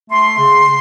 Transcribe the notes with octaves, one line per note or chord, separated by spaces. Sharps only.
A3 C6
C#3